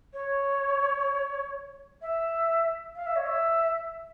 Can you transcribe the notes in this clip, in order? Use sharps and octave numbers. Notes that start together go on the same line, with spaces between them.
C#5
E5
F5
E5
C#5
E5